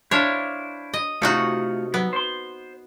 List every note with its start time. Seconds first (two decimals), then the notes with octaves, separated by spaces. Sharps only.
0.11 D4 E4 C5 C#5 F5
0.94 D#5
1.22 C3 A3 D#4 F4 F#4 C#5
1.94 F#3 B3
2.13 C5 C6